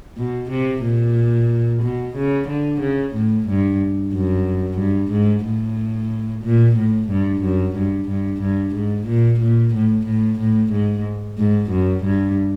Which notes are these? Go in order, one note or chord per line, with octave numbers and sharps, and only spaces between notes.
B2
C3
A#2
B2
C#3
D3
C#3
A2
G2
F#2
G2
G#2
A2
A#2
A2
G2
F#2
G2
G2
G2
G#2
A#2
A#2
A2
A2
A2
G#2
G#2
F#2
G2